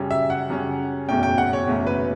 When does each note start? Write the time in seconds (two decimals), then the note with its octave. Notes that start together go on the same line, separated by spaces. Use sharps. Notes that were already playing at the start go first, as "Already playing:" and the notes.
Already playing: F#2 C#3 G3 C#4
0.11 E5
0.30 F#5
0.50 F#2 C#3 G3 C#4
1.08 F#1 E2 B2 A3 C#4 G5
1.23 G5
1.38 F#5
1.53 C#5
1.67 F#1 E2 B2 A3 C#4
1.87 B4